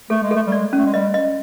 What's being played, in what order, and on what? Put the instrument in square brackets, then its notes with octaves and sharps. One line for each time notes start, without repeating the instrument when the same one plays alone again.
[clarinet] A3 [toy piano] A4
[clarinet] G#3
[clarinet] A3 [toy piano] A4
[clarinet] G3
[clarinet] G#3 [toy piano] D5
[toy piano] C#4
[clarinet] A3
G#3
[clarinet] G3 [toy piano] D#5
[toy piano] D#5